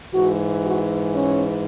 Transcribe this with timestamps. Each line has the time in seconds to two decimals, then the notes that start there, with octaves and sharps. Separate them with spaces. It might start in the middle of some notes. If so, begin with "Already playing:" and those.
0.14 G#2 E3 F#4
0.64 F#4
1.15 C#4